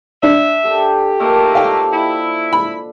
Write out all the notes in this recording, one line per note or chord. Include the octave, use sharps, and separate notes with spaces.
D4 E5
G4 A4 D6
A#2 A3 A#3 D#4 A4
D4 C5 F5 G5
E4
B5